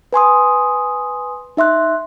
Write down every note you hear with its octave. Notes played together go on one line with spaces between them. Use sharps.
B4 G#5 C6 D#6
D#4 E5 C6 F#6